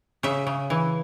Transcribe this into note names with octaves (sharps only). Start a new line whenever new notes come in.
C#3 E5
C#3
E3